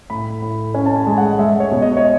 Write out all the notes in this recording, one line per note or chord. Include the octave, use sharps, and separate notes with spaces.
A2 B5
A2
C#4 G#5
A5
G#5
G#3
F#5
G#3 E5
C#5
B2
D#5
C#5